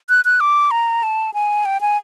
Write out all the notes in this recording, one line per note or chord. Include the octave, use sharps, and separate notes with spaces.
F#6
F#6
D6
A#5
A5
G#5
G5
G#5